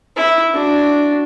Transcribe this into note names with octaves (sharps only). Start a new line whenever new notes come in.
E4
D4 F#4